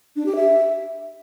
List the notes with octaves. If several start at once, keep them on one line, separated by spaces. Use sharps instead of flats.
D4
G4
E5